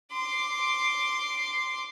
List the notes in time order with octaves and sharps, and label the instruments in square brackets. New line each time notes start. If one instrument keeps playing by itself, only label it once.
[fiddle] C6 D6